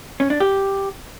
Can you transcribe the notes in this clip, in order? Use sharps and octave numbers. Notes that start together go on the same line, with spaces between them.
C#4
D4
G4